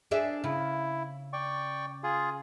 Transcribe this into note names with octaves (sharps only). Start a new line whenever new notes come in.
D4 G#4 E5
C#3 E4
D5 G5 C#6
F4 G#4